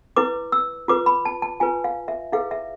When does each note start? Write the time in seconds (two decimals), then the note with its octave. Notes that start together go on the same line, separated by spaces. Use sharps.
0.16 E4 B4 D6
0.52 E6
0.88 F4 B4 D6
1.06 B5
1.25 A5
1.42 A5
1.60 F4 B4 G#5
1.84 F5
2.08 E5
2.32 E4 G#4 B4 F5
2.51 E5